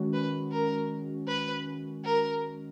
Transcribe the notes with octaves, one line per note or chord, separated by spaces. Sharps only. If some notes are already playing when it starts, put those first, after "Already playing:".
Already playing: D#3 G#3 C#4 F#4
B4
A#4
B4
A#4